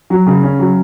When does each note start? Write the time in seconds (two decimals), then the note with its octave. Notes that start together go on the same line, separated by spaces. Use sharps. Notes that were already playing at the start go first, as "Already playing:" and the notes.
0.10 F#3
0.27 C#3
0.43 C#4
0.59 F#3